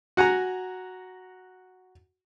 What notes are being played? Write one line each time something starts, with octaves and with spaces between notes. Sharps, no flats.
F#4 F#5 G#5 A#5